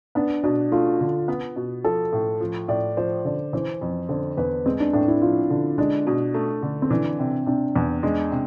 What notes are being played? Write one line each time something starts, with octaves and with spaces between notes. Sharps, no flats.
B3 D4
B2 D4
A3 F4
D3
B3
B2
F3 A4
A2
F3
A2 D5
F3 C5
D3 D5
E3 C5
F2
D3 C5
E2 B4
G#3 C4
D4
A2 D4
E4
F3 F4
D3
G#3 D4
B2
A3
D3
C4
E3 D4
C3
C3 D4
E2
G#3 D4
C3